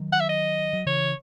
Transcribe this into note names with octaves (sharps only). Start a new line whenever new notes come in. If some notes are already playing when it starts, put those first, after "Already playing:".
Already playing: D#3 F#3
F#5
E5
D#5
F#3
C#3 E3 C#5